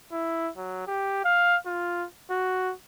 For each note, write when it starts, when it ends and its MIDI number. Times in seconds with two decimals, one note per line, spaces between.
0.12 0.50 64
0.57 0.86 54
0.87 1.24 67
1.24 1.57 77
1.66 2.05 65
2.30 2.73 66